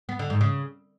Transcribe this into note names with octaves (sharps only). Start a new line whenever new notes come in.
B3
D3
G#2
C#3